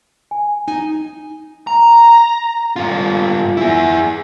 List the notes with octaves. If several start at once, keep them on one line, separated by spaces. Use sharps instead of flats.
G#5
D#4 G#5
A#5
G2 F4
E4 G#4